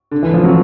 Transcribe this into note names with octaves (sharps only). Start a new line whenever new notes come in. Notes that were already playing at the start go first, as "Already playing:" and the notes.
D3
E3
F3
F#3